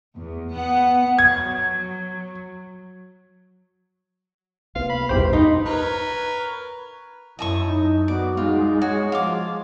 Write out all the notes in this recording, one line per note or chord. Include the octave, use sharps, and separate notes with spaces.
E2
B3 F#5
F#3 G#6
C2 A#3 B3 F5
B5
A#1 E2 G2 B2 G4 C5
D#4 F4
A#4 B4 C#5
F#2 E4 D#5 A5 C#6
D#4
B3 F#4 D5
G#3 D#4 F4
F#4 C#5
F3 F4 D6